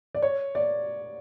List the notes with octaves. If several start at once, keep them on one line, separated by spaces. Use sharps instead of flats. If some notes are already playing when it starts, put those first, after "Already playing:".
D5
C#5
D5